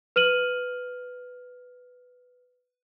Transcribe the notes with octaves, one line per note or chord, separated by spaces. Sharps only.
B4 F6 D#7 F#7